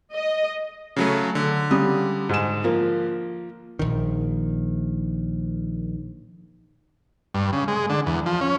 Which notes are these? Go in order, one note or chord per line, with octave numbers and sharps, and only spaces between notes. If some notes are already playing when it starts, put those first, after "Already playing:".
D#5
C#3 F#3 A3
D3
C#3 G3 D#6
G#2 E7
F3 A#3
A#1 D#3
G2
C#3
G#3
D3
E2
F3
C#4